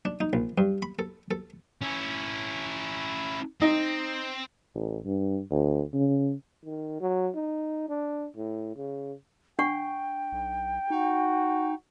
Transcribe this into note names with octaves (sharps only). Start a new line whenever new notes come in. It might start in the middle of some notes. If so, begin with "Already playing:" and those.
D4
D#4
A#1
G2
B5
A4
A4
C#4 E4
C4 D#4
A1
G2
D2
C#3
D#3
F#3
D#4
D4
A2
C#3
D4 F#5 G5 C#6
B1
D#4 F#4